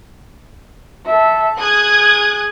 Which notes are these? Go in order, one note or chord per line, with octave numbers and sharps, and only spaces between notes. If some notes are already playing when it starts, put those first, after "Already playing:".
A4 E5
G#4 D#6 F#6 G#6